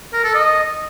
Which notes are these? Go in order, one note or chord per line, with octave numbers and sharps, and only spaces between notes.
A#4
A4
D#5